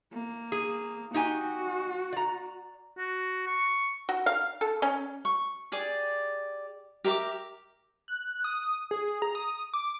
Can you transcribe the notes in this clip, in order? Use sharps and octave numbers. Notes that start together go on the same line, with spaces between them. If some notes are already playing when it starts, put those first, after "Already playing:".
A#3
G#4
D#4 F#4 G4 G#5
D5 A#5
F#4
C#6
F#4
F5
A4
C#4
C#6
G4 G#4 D5
G4 A#4 E5 D6
F#6
D#6
G#4
A#5
D#6
D6